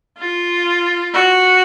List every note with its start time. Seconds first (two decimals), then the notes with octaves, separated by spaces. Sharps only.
0.18 F4
1.14 F#4